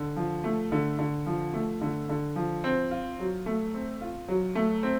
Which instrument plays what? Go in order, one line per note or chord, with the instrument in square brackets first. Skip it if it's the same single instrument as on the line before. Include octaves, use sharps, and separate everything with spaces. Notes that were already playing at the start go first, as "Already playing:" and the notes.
Already playing: [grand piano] D3
F3
A3
D3
D3
F3
A3
D3
D3
F3
C4
F4
F#3
A3
C4
F4
F#3
A3
C4